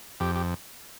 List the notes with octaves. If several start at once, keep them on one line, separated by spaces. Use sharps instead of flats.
F2 G4
G4